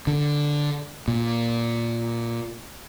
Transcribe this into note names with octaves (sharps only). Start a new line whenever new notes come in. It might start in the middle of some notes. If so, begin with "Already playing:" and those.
D3
A#2